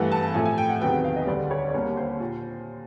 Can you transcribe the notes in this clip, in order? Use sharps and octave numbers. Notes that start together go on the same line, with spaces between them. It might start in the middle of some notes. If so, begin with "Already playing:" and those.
Already playing: G2 E3 A3 F#5
A5
A2 F3 A3 G#5
G#5
G5
F#5
E2 C3 D#3 F#3 B3 G5
F#5
F5
D#5
D2 D3 G3 D5
C#5
D5
D#2 D3 G3 A#3 C#5
C5
A#2